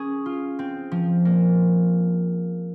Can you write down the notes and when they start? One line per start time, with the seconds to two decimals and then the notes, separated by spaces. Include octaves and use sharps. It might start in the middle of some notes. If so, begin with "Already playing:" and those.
Already playing: C#4 G#4
0.26 F4
0.59 C4
0.91 F3
1.25 A#3